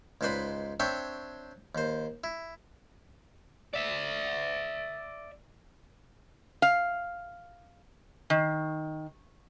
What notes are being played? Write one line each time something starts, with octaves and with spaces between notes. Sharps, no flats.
C#2 G#2 B4 C5 D5 B5
C4 D4 C#5 E5 G5
D#2 C5
E4
D5 E5
F5
D#3